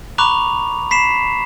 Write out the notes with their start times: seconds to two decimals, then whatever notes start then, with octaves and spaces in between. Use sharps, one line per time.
0.18 A#5 B5 C#6 D6 F#6 F7
0.91 B5 B6 C7 E7